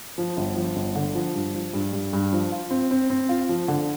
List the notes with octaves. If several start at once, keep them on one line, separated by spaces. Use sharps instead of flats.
F3
G1
F3
G1
D3
F3
G2
F3
G2
G2
G2
F3
F4
C4
C4
C4
F4
F3
D3